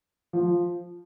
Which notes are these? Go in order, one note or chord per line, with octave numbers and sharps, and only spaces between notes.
F3